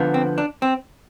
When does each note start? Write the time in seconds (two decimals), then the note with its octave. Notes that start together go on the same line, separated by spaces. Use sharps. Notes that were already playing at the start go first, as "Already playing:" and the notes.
Already playing: D3 F3 B3
0.14 C4
0.38 D4
0.62 C4